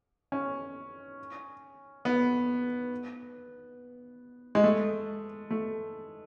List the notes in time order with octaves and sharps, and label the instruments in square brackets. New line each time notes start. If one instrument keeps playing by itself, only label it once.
[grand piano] C#4
B3
G#3
A3
A3